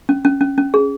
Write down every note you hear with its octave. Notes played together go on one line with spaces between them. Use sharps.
C#4
C#4
C#4
C#4
G#4